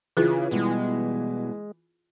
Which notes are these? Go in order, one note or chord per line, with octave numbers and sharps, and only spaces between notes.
C#3 E3 F4 G#4 B4
B2 G3 G#3